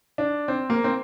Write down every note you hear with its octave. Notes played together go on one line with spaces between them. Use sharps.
D4
C4
A#3
C4